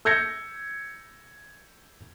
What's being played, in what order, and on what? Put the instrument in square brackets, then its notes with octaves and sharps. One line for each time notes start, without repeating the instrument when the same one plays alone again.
[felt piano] E6 G6 G#6 A#6 C#7